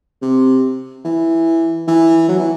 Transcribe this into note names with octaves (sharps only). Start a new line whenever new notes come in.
C3
E3
E3
F#3
E3